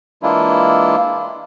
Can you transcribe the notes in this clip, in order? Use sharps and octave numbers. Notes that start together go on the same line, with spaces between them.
E3 G#3 A#3 D4 E4 F4